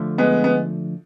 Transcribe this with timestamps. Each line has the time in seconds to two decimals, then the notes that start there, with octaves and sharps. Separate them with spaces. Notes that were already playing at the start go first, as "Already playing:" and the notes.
Already playing: D3 F3 A3
0.18 G#3 B3
0.44 B3